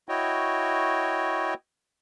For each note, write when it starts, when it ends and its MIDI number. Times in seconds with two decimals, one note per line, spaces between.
0.09 1.54 64
0.09 1.54 66
0.09 1.54 73
0.09 1.54 75
0.09 1.54 79